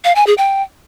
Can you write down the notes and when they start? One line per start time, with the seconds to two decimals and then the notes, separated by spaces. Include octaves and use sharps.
0.05 F5
0.16 G#5
0.27 G#4
0.38 G5